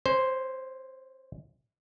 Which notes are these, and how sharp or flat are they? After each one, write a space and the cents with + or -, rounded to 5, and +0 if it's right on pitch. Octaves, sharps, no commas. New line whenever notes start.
C#4 -30 C5 +0